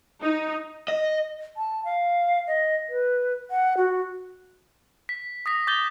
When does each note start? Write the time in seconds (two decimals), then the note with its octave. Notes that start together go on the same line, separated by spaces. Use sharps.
0.23 D#4
0.88 D#5
1.57 A5
1.85 F5
2.48 D#5
2.89 B4
3.50 F#5
3.77 F#4
5.09 B6
5.46 D#6 A#6 B6
5.67 D6 G6 A6 G7